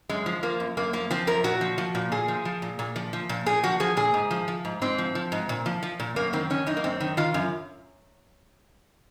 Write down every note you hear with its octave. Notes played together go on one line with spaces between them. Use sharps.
F#2 G#3
F3
F3 A#3
F#2
F#2 A#3
F3 A#3
F3 C4
F#2 A#4
A#2 F#4
F3
F3
A#2
A#2 G#4
F3
F3
A#2
A#2
F3
F3
A#2
A#2 G#4
F3 F#4
F3 G#4
A#2 G#4
G#2
F3
F3
G#2
G#2 C4
F3
F3
G#2
A#2
F3
F3
A#2
F#2 A#3
D#3 C4
D#3 C#4
F#2 D#4
A#3
F#2 C4
D#3
D#3 F4
F#2